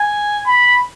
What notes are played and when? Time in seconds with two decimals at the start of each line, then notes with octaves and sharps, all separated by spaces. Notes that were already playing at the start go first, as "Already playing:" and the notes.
Already playing: G#5
0.47 B5